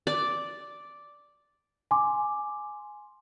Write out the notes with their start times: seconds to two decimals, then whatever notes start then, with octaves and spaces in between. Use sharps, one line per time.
0.07 D5
1.91 G#5 C6 D6